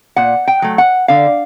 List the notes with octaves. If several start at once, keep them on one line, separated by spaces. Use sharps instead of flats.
A#2 F#5
G5
F#3 A3
F#5
D3 F5